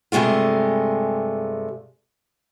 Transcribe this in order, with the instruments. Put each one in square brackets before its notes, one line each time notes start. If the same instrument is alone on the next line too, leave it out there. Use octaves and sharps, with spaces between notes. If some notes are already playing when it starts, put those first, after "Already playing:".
[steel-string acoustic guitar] G2 C3 G#3 A3 F4